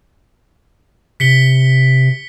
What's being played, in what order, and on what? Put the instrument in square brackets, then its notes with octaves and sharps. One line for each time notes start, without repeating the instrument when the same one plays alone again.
[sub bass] C3 [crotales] B6 C#7 G7